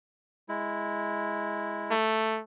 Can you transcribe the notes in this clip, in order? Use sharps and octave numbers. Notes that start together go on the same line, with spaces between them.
G#3 E4
A3